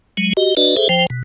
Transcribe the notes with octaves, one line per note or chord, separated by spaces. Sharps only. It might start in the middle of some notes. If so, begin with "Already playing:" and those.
F#3 G#3
F#4 G4 D#5
D4 F#4 B4 D5 D#5
G#4 A4 C5 E5
F3 C5 G5
B2